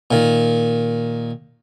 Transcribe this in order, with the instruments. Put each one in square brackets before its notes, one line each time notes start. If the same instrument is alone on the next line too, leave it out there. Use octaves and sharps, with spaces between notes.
[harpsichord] A#2 D#3